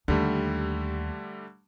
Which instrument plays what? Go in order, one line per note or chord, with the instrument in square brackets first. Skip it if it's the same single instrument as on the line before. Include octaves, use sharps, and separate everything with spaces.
[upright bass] D#2 [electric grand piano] D3 G3 A3